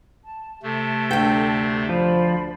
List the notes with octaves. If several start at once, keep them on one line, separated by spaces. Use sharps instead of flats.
A5
C3 A3 A4
D2 G5
F3 C5 D5 B5